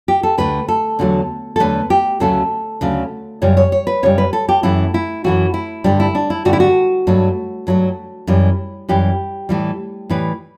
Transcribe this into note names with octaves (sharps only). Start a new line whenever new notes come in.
G4
A4
D2 D3 A3 B4
A4
E2 D3 F#3 A3
A4
E2 D3 F#3 A3 B4
G4
D2 C#3 F#3 A3 A4
D2 C#3 F#3 A3
F#2 C#3 G3 C#5
C#5
C#5
B4
F#2 C#3 G3 C#5
B4
A4
G4
F#2 E3 A3 E4
E4
F#2 E3 A3 F#4
E4
G2 D3 G3 D4
E4
D4
E4
G2 D3 G3 F#4
E4
F#4
G2 F#3 A3
G2 F#3 A3
F#2 E3 G3
F#2 E3 G3 G4
A2 E3 G3
A2 E3 G3 B4